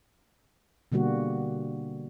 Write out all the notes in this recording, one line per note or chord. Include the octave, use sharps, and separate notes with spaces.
B2 D3 G3 A#3 F#4